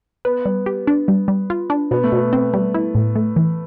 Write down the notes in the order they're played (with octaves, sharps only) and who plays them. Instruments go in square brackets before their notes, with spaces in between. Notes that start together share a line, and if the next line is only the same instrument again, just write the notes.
[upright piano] B3 [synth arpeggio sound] B4
[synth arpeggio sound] G3
G4
D4
G3
G3
F4
D4
[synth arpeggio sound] B2 [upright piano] B3
[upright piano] A3
[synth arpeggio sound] B2 [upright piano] B3
[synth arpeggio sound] C4
G3
E4
A2
A3
E3